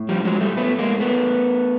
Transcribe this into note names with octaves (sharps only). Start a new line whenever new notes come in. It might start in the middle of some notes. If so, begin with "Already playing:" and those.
Already playing: A2
F3 G3
F#3 G#3
G3 A3
A3 B3
G#3 A#3
A3 B3